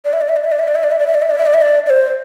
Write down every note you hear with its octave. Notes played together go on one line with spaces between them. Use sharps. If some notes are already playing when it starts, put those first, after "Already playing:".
D5
E5
D5
E5
D5
E5
D5
E5
D5
E5
D5
E5
D5
E5
D5
E5
D5
E5
D5
E5
D5
D5
C5